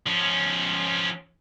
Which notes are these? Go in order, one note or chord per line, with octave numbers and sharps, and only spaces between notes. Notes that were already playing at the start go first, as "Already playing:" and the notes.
F3 C#4